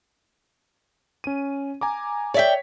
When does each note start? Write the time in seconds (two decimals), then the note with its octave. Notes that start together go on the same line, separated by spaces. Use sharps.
1.24 C#4 D#7
1.81 G#5 A#5 D6
2.34 C#5 D5 E5 G5 B6